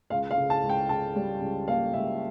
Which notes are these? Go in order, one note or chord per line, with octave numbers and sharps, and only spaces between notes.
C#2 F5
F5
C#3
A5
C#2
G5
C#3 A5
G3
C#2
A#3 F5
C#2 E5